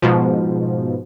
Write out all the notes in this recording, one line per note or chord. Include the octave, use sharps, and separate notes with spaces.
G#2 B2 F3